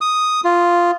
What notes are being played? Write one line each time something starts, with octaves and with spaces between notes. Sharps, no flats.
D#6
F4